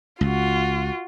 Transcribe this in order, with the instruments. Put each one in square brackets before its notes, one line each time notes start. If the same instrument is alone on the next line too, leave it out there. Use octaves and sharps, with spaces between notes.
[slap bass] C#2 [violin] F4 F#4